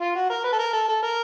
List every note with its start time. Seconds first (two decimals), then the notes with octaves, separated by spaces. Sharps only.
0.01 F4
0.15 F#4
0.30 A#4
0.44 B4
0.52 A4
0.59 A#4
0.73 A4
0.88 A4
1.03 A#4